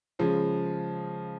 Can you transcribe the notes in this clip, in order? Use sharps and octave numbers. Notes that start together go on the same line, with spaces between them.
C#3 F3 G#3